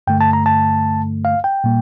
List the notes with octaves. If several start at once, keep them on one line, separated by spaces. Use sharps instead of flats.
G2 D3 A3 G5
A5
A#5
A5
F5
G5
A#2 G3 A#3